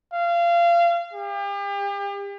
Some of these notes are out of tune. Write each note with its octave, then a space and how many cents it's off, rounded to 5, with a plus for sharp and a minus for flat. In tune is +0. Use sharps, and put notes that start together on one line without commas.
F5 -25
G4 +40